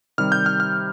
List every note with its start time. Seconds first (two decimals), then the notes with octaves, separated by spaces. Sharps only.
0.18 C3 D#3 G3 F6
0.32 G6
0.46 F6
0.60 F6